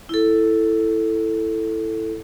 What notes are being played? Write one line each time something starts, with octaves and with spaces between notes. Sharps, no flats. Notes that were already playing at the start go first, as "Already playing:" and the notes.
E4 A4